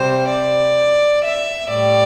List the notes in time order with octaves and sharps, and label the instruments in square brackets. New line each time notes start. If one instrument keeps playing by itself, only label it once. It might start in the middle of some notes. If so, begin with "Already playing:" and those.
Already playing: [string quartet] C3 G3 C5
D5
E5
A2 G3 D5